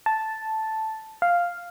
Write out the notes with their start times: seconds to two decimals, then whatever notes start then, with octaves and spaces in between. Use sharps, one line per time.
0.06 A5
1.22 F5